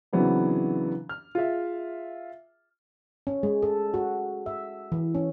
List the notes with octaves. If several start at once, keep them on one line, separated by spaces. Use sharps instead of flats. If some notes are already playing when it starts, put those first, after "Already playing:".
C#3 E3 F#3 B3 C4 D4
F6
F4 G#4 E5
C#4
G#3
A4
F#4
E5
E3
C#4